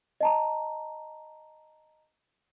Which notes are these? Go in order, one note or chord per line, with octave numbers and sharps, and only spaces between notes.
D#5 A5 A#5